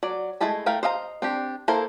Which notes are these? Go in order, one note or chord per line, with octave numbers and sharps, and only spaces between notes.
F#3 D5
G#3 A3 E4 A5 B5
A3 E4 A#4 F5 G5
C5 D#5 F5 G5 A#5
C4 D4 G4
A#3 E4 A4 A#4 C5